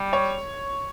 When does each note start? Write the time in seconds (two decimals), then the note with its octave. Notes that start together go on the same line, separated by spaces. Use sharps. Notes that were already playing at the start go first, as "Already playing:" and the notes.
Already playing: G3
0.13 C#5